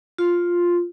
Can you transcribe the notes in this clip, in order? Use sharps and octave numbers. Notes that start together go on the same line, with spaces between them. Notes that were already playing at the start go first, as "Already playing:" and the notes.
F4